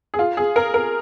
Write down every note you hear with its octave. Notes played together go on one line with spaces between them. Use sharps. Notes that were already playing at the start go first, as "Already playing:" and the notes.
G#4
F4
G#4
A#4
A#4